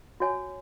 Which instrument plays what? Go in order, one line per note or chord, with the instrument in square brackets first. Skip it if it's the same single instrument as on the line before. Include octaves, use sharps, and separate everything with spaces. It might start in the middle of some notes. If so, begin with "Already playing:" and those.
[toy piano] F#4 C#5 G#5